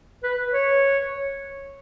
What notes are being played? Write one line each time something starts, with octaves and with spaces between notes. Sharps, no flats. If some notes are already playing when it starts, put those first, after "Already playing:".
B4
C#5